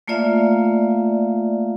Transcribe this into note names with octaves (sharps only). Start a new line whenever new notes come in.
A3 A#3 F4 D5 E5 F5